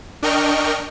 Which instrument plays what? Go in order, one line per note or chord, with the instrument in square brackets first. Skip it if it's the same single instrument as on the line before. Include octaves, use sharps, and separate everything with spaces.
[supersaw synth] D4 A#4 D#5 G5 C#6 F6